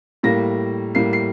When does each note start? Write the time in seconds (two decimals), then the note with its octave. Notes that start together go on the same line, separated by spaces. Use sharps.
0.23 A2 G3 A#3 A#6
0.95 A2 G3 A#3 C7
1.13 C7